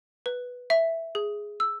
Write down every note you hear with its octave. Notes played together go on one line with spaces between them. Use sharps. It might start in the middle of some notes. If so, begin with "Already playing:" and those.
B4
E5
G#4
E6